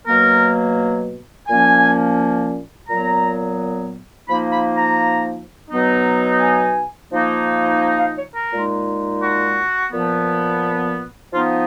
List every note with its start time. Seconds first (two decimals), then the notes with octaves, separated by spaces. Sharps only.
0.07 B2 F#3 A#3 A#4
1.47 A#2 F3 A#3 C#4 G#5
2.89 A#2 F#3 B3 A#5
4.29 F3 A#3 D#4 B5
4.52 B5
4.76 A#5
5.70 B2 F#3 B3 D#4
6.40 G#5
7.11 F3 A#3 D#4
7.98 F5
8.17 C#5
8.34 A#4
8.51 A#2 G#3 D#4
9.22 F#4
9.92 A#2 F3 B3
11.32 F3 B3 D#4 F4